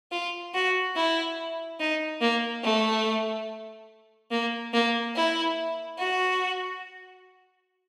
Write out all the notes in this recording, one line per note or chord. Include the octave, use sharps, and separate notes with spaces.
F4
F#4
E4
D#4
A#3
A3
A#3
A#3
E4
F#4